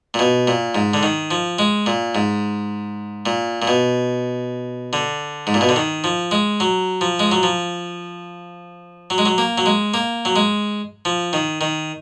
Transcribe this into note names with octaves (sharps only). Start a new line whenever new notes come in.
A#2
B2
A#2
G#2
D3
D#3
F3
G#3
A#2
G#2
A#2
A#2
B2
D3
G#2
A#2
B2
D3
D#3
F3
G#3
F#3
F3
G#3
F#3
F3
F#3
G#3
F#3
A#3
F#3
G#3
A#3
F#3
G#3
F3
D#3
D#3